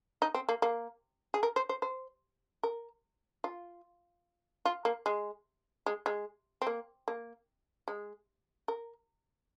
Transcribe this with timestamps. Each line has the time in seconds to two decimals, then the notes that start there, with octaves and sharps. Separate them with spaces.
0.22 D#4
0.34 C4
0.49 A#3
0.62 A#3
1.34 G#4
1.43 A#4
1.56 C5
1.69 C5
1.82 C5
2.63 A#4
3.44 F4
4.65 F4
4.85 A#3
5.06 G#3
5.86 G#3
6.06 G#3
6.62 C4
6.67 A#3
7.08 A#3
7.88 G#3
8.68 A#4